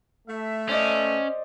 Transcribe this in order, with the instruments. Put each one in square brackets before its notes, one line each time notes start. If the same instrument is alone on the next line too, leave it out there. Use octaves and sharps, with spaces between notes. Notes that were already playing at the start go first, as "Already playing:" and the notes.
[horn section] A3 E5
[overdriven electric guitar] C#4 [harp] C5 D5 D#5